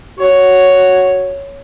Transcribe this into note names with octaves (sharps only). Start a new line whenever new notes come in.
F#4 C#5